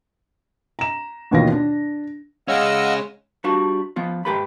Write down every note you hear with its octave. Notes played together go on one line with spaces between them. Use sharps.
A#5 E7
A1 D#2 B2 D#3 F4 A#6
D4
G#3 C#4 G#4 D#5 F5 F#5 E6
G3 D4 F4 F#4 A5
F3 B3 F4
G#2 G4 A4 B4 B5